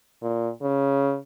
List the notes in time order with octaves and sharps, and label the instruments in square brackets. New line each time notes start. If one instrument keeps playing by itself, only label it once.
[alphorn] A#2
C#3